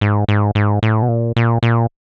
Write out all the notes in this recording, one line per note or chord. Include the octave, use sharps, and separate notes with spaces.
G#2
G#2
G#2
A2
B2
A#2
A#2
A#2